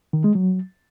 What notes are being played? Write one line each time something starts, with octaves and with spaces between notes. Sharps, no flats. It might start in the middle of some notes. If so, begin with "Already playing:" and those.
D#3
G#3
F#3